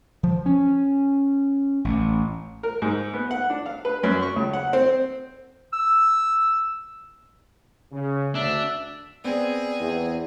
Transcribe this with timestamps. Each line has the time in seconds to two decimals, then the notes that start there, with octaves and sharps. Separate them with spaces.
0.23 F3
0.46 C#4
1.85 A1
2.63 A#4
2.82 G#2
3.14 B3
3.31 F#5
3.50 D4
3.66 F5
3.85 B4
4.03 F#2
4.23 C#6
4.36 C#2
4.53 F#5
4.73 C4
5.73 E6
7.92 C#3
8.35 D2 D4 E5
9.24 B3 C4 G#4 D5
9.80 E2